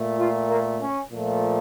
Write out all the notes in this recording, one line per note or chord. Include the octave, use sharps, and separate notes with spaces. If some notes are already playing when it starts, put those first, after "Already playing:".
Already playing: A#2 A3
F4
A#3
C#4
A#2 F3 A3